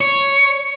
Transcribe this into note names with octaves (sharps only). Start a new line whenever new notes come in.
C#5